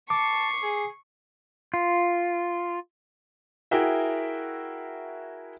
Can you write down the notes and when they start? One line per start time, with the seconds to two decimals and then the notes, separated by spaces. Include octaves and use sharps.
0.10 A5 C#6 D6 C7
0.63 G#4
1.74 F4
3.71 E4 F#4 G#4 A#4 E5 G5